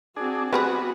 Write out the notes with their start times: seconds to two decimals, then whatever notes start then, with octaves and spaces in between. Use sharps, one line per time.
0.16 C4 D4 F#4 G#4
0.53 G3 B3 C4 F#4 G#4 B4